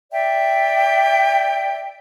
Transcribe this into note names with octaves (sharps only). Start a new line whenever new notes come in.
D5 E5 G5